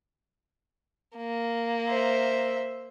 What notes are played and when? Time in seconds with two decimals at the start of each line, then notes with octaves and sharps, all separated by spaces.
1.17 A#3
1.88 C5 E5